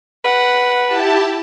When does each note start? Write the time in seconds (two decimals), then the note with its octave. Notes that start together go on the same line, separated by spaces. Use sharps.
0.25 B4 F#5
0.86 E4 G4 A5